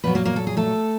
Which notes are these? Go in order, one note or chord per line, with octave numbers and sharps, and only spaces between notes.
A#2 F#3 B3 B4
A#3 A#4
A#3 A#4
A4
G#4
A3 A4